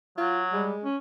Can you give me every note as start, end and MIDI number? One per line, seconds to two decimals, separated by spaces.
0.18 0.68 54
0.18 0.42 65
0.53 0.73 55
0.53 0.86 56
0.84 0.97 61